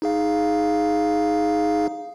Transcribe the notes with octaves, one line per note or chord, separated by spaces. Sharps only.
D#4 G#4 F5